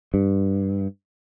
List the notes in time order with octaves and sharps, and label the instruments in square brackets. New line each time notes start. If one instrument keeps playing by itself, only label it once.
[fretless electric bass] G2